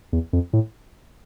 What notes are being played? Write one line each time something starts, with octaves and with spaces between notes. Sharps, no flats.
E2
F2
A2